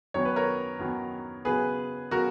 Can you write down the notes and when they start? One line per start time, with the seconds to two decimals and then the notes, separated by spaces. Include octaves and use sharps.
0.14 F#2 D#3 F#3 B3 C#5
0.25 B4
0.36 A#4 C#5
0.79 F#2 D#3 F#3 B3
1.45 C#3 F#3 B3 G#4 B4
2.11 C#3 F#3 B3 F#4 A#4